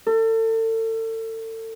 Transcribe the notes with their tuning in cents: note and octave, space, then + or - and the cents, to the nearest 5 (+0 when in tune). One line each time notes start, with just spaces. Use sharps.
A4 +35